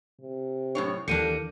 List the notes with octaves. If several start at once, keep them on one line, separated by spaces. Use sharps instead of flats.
C3
F#2 A2 D4 C#5
D#2 E3 G3 A#3 D4 A4 C#7 D#7